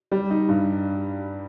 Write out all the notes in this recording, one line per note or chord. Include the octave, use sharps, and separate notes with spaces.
G3
D#4
G2